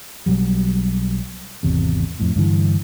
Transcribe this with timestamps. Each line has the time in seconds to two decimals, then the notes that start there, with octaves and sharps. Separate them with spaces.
0.26 B1 B2 F#3 G3
1.63 G#1 E2 C3
2.20 F2 A2
2.36 G2 D3 E3